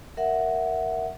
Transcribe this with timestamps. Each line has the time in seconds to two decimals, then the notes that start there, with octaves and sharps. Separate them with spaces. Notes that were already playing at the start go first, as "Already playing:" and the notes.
0.17 A#4 E5 F#5